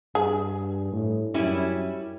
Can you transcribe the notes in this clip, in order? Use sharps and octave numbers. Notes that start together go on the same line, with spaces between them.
G2 G#4
A2
F#2 G3 C#4 E4